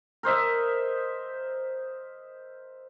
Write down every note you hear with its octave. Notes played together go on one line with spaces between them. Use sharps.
A#4 C5 D#5 E5